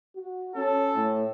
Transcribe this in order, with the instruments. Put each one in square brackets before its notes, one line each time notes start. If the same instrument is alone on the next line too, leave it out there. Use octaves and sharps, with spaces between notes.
[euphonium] F#4
[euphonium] C#4 [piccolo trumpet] A4
[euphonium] A2